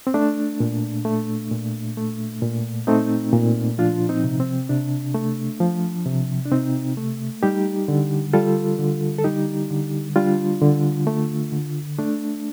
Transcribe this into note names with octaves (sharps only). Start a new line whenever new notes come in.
C4
A3 D4
A#2
A3
A#2
A3
A#2
A3 C4 D#4
A#2
F3 D4 F4
C4 D#4
C3
C4
C3 D4
A3
F3
C3
D4
C3 C4 D#4
A3
G3 D#4 G4
D3
G3 F4 A4
D3
A4
G3 D#4 G4
D3
G3 D4 F4
D3
A3
D3
A3 D4